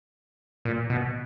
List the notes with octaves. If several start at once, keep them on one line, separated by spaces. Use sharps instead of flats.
A#2
B2